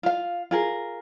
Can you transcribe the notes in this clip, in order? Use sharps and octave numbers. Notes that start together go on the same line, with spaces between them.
F4 F5
F4 G#4 A#4